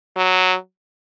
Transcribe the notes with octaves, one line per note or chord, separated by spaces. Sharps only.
F#3